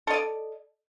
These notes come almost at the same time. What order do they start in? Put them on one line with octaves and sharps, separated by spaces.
A4 D#5 D5